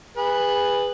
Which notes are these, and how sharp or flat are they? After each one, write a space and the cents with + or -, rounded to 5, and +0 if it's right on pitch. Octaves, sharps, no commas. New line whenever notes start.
G#4 -25 B4 +0